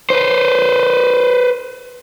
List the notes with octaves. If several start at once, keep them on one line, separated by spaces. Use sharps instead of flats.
B4 C5